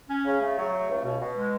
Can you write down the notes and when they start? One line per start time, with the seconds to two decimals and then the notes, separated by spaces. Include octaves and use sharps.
0.09 C#4
0.25 C#3
0.41 A3
0.57 F#3
0.73 A3
0.89 C#2
1.05 B2
1.21 B2
1.37 G#3